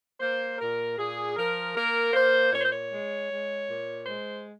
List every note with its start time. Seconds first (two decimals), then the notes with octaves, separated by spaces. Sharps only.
0.21 A#3 C5
0.59 A#2 A#4
0.98 A#2 G#4
1.37 F3 A#4
1.75 A#3 A#4
2.13 A#3 C5
2.52 A#2 C#5
2.61 C5
2.70 C#5
2.90 G#3
3.29 G#3
3.68 A#2
4.06 G#3 C5